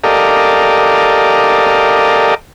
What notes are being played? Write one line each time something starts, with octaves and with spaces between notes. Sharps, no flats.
G4 A4 A#4 D5 D#5 F5